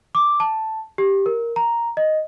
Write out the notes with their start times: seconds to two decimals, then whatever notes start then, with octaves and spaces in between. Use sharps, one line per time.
0.15 D6
0.40 A5
0.98 G4
1.26 A#4
1.56 A#5
1.97 D#5